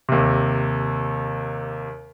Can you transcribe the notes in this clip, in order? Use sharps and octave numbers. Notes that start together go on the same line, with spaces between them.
D#2 C3